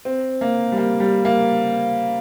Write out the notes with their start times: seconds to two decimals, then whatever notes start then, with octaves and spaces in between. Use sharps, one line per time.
0.05 C4
0.41 A#3
0.72 G3
0.77 A#3
1.00 G3
1.25 A#3